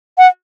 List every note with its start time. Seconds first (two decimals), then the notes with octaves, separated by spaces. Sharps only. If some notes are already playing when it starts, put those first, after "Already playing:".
0.18 F#5